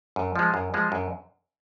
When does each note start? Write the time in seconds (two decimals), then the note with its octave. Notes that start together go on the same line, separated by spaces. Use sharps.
0.16 F#2
0.36 F3 G#3
0.54 F#2
0.74 F3 G#3
0.92 F#2